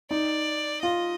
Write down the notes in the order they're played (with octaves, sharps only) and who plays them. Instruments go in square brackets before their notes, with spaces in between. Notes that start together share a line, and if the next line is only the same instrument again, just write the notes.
[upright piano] D#4 [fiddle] D5
[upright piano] F4 [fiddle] D#5